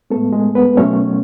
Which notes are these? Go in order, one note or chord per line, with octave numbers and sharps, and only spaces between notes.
A2 G#3 A3 B3 A4
G#3 G#4
B3 B4
B2 F#3 A3 C#4 C#5